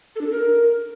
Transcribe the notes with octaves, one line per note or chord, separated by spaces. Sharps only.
A4
D4
A4
A#4